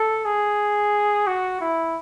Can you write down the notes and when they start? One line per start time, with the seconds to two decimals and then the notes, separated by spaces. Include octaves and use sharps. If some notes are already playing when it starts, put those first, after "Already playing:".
Already playing: A4
0.25 G#4
1.27 F#4
1.61 E4